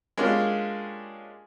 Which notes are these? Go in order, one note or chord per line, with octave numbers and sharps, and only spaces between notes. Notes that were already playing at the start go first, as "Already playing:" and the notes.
G#3 A#3 C#4 D4 F4 G4